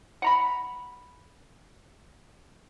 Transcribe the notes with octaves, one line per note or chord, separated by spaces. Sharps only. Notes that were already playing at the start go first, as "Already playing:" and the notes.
F#5 A#5 B5